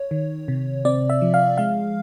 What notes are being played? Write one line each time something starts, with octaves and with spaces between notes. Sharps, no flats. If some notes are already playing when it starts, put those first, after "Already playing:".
Already playing: C#5
D#3
C3
C4 D5
E5
F3
F5
G#3 F5